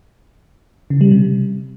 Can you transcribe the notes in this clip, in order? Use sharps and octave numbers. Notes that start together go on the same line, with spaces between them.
C#3
G3
C3